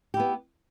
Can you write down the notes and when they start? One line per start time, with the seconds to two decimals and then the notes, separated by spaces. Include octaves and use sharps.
0.14 G4
0.17 E4
0.20 B3